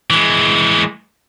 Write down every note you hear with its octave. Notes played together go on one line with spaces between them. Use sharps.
E3 G#3